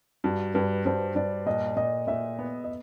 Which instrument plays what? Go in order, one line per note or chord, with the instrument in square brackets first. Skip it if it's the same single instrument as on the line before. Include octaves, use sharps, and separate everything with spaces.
[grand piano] G2 [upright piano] F#4
[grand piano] G2 [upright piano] B4
[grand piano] G2 [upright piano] C5
[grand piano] G2 [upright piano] D5
[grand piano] A#2 [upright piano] D#5
[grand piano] A#2 [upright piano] D#5
[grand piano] A#2 [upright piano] E5
[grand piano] B3
[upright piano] D#5